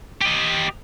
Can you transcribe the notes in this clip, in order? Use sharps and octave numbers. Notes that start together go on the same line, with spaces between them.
G4 D#5